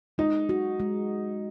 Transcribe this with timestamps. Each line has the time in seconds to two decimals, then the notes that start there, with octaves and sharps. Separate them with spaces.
0.18 G#3 D#4
0.49 F#4
0.80 G#3